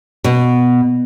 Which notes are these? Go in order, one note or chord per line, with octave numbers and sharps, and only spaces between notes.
B2